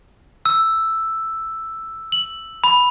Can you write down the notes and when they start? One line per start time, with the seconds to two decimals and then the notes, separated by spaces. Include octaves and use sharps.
0.46 E6
2.12 F#7
2.64 B5